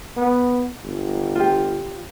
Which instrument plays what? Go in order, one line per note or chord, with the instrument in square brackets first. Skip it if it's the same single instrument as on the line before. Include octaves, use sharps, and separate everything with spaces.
[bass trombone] B3
G1
[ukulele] F4 G4